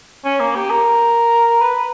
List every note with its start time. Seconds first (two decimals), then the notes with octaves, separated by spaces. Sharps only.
0.25 C#4
0.40 A#3
0.55 G4
0.70 A#4
1.61 B4